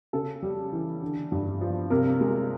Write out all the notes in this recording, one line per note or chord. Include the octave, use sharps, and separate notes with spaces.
C#3 A4
G3
E3
D3
G2
F3
C3 A#4
G#3